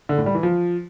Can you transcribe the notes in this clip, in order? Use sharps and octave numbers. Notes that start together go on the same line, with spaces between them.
D3
A2
G3
E3
F3